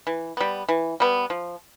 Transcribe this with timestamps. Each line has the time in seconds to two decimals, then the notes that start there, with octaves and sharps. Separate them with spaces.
0.07 E3
0.37 G3 B3
0.69 E3
1.00 G3 B3
1.30 F3